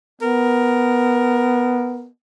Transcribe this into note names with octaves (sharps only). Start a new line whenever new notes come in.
B3 A#4